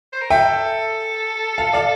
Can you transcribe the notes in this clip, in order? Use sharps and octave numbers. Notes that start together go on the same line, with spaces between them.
C5
A#4
A4 E5 G5
F5 A5
D5 F5